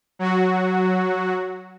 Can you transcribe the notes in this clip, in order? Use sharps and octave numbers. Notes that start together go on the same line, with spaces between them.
F#3 F#4